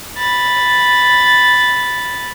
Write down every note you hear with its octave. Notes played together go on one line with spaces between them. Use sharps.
B5 A6